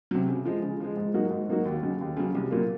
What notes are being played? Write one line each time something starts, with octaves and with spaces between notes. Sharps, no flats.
C3 F#3
C#3
F3 G#3
C#3
F3 G#3
G#2
F#3 A#3 D#4 F#4
G#2
F#3 A#3 D#4 F#4
D#2
C#3 F#3
D#2
C#3 F#3
C2
A#2 F#3 A#3